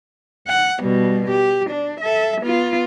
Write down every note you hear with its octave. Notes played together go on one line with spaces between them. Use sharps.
F#5
B2 G3
G4
D4
A4 E5
B3 F4